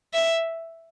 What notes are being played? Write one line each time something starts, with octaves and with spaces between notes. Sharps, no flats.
E5